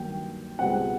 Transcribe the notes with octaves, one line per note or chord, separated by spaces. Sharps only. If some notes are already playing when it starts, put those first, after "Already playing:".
Already playing: G2 D#3 F#3 A#3 G5
C#2 B2 G3 C4 F#5